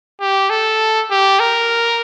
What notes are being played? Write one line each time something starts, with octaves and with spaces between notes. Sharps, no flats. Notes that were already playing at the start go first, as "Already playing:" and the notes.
G4
A4
G4
A#4